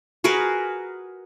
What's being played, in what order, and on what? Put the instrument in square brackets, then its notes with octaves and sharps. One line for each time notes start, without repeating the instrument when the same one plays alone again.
[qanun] F#4 G#4 A#4 B4